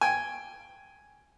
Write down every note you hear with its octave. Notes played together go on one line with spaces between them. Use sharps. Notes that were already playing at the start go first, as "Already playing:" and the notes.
G5 G#5